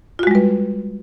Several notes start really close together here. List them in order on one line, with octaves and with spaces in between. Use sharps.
F4 F#4 G#3 G3 B4